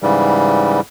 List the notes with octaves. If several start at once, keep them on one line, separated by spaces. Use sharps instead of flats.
G#2 C#3 E3 G3